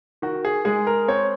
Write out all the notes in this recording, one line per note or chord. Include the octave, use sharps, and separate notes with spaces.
D#3 F#4
G#4
G#3 G#4
A#4
C4 C#5